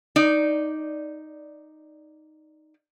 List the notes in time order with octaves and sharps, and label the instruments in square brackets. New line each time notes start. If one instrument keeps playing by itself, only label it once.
[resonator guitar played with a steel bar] D#4 D5